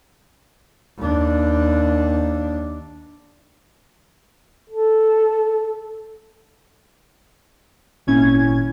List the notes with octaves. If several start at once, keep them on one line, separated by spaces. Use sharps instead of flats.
D#2 D4
A4
G#1 A#2 C#4 E4 G#6